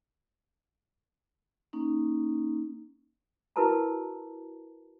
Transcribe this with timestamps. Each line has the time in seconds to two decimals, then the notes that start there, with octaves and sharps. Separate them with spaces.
1.73 A#3 C#4 D#4
3.56 E4 F#4 A#4 B4 A5 A#5